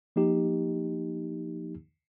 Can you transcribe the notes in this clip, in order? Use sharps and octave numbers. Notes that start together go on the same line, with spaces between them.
F3 A#3 D#4 G4